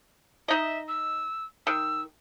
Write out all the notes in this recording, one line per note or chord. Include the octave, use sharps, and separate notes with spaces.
D#4 D#5 E5
E6
D#3 E6